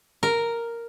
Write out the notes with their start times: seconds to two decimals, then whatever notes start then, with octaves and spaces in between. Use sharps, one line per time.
0.23 A#4